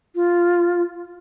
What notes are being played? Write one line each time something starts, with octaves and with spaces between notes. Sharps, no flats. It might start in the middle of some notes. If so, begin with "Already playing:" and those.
F4